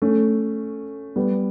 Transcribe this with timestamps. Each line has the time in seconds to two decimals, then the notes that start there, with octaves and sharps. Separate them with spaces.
0.02 A3 C#4
1.16 G3 B3